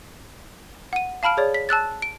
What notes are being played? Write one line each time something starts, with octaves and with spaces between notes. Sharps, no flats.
F#5 D#7
F5 A5 B5 F6 D7
G#4 C#5 D5
B6
A5 E6 F#6 A6
D7